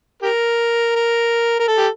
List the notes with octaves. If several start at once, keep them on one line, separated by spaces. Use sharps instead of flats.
G4 A#4
A#4
A#4
A4
G4